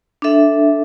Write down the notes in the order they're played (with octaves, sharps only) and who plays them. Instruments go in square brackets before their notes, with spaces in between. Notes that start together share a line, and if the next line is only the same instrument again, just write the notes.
[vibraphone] D4 A4 E5